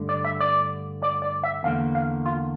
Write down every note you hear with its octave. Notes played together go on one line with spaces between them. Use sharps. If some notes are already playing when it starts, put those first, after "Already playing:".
Already playing: G2 D3 A3
D5
E5
D5
D5
D5
E5
E2 D3 F3 A#3 F5
F5
F4